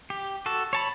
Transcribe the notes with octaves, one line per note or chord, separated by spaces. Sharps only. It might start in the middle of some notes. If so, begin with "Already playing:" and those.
G4
F#4 A4
C#5 A5 B5